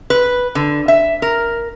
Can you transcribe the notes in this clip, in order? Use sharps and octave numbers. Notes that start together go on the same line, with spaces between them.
B4
D3
E5
A#4